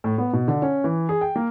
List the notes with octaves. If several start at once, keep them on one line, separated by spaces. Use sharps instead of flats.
A2
B3
B2
D3
C#4
E3
G#4
G5
A#3